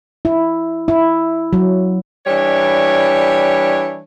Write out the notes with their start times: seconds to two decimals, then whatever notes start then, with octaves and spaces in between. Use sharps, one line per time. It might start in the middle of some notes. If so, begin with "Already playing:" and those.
0.25 E4
0.88 E4
1.53 F#3
2.26 E3 G3 D4 C#5